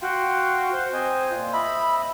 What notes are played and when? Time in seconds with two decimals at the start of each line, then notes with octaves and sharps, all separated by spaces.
0.02 F#4 F5 G5 C6
0.72 C5
0.93 C4 D#5 G#5
1.31 A#2 F4
1.53 D#5 E5 B5